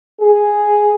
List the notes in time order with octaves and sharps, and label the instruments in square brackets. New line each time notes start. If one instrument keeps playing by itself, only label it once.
[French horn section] G#4